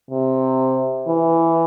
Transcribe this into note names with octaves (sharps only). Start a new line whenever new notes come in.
C3
E3